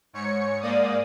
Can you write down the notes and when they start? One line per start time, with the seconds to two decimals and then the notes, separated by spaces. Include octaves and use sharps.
0.13 G#2 C#5 C#7
0.61 G#2 A#3 D5 D#6